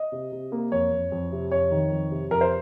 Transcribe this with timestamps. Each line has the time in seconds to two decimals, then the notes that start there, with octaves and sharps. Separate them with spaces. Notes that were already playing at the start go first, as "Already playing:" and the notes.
Already playing: D#5
0.12 C3
0.32 C3
0.52 A#3
0.72 F2 C#5
0.92 F2
1.12 F2
1.32 C3
1.52 F2 C#5
1.72 D#3
1.91 F2
2.11 C3
2.31 F2 A#4
2.41 C5